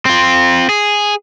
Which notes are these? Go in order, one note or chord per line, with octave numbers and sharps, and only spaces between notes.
C4 F4
G#4